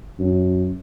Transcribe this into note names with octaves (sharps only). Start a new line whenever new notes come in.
F#2